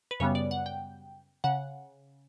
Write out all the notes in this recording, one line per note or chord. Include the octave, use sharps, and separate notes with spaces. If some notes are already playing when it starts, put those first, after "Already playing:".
B4
F#2 C#3 G3 B3 C#5
D5
F#5
G5
C#3 F#5